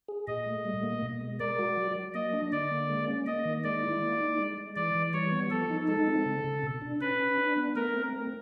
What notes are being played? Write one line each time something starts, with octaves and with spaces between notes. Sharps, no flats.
G#4
A#2 D#5
A3
G3
A#3
B2
G#3
A#4 D5
F#4
F#3
F#3
A#3 D#5
D4
D3 D5
A#3
G#3
C#4
A#3 D#5
D#3
G#3 D5
E4
A#3
D#4
G#3
G#3
E3 D5
E3
G3 C#5
B3
F3 A4
D#4
G#3 A4
C4
C#3
C#3
B2
D4
C#4 B4
C#4
D4
B3
A3 A#4
C4
A3